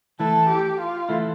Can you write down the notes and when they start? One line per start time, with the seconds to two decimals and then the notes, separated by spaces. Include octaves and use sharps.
0.20 E3 A3 E4 A4
0.49 G4
0.80 F4
1.09 E3 A3 E4